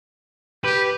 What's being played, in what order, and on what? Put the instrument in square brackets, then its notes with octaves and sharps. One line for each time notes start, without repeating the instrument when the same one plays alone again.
[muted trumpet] G4 [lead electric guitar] B4